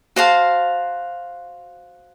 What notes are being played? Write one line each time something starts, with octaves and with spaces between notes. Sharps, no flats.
F#4 C5 F5 A5